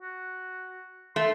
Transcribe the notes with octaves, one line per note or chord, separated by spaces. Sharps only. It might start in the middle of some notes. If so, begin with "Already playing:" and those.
F#4
A3 C6